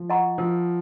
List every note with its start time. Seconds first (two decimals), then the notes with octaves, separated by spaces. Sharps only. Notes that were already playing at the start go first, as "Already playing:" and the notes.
Already playing: F3
0.10 D#5 F#5 A#5 C#6
0.38 F3 A#4